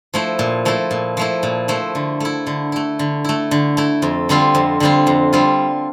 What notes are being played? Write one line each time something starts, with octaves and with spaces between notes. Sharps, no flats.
F3 A3 E4
A#2
F3 A3 E4
A#2
F3 A3 E4
A#2
F3 A3 E4
D3
A3 E4
D3
A3 E4
D3
A3 E4
D3
A3 E4
F2
D3 G3 C4 F4
F2
D3 G3 C4 F4
F2
D3 G3 C4 F4